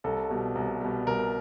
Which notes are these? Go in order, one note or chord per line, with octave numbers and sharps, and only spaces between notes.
C2 A4
B2 G3
C2
B2 G3
C2 A#4